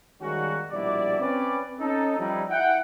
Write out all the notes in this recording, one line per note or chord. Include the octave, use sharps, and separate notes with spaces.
D#3 G3 G#3 A#3 C#4 F#4
A#1 B2 G3 E4 D5
C4 C#4 B4 D5
C#4 D#4 A4
F3 G3 D#4 E4
E4 F#5 G5